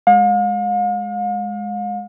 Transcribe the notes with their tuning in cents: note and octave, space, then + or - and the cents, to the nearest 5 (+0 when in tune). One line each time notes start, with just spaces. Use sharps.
G#3 +0 F5 +40